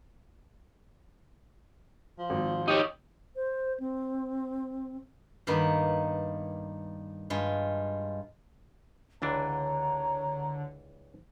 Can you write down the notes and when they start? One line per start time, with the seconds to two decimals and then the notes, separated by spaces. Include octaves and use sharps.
2.18 F3
2.30 G#1
2.68 D#4 G4 C#5
3.36 C5
3.80 C4
5.47 G2 D#3 A#3 B3
7.30 G2 G#3 F4
9.22 C#2 D3 E3 D4 C#5 A#5